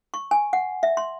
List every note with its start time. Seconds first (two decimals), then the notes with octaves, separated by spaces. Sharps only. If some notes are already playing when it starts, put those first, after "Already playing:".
0.14 C#6
0.31 G#5
0.53 F#5
0.83 E5
0.97 C6